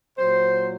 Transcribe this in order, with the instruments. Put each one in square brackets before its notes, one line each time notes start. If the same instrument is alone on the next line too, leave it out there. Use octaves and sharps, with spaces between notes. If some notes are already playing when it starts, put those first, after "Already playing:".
[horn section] A#2 F#3 C5